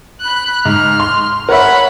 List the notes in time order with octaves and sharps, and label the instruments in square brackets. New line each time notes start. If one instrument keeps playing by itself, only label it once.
[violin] B5 F#6
[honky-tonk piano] G#2 [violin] F6
[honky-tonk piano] C6
[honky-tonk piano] A#4 C#5 E5 [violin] F#5 B5